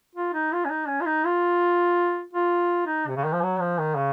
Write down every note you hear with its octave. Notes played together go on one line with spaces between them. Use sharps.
F4
D#4
F4
C#4
D#4
C#4
F4
D#4
F4
F4
D#4
C3
C#3
D#3
F3
F#3
F3
D#3
C#3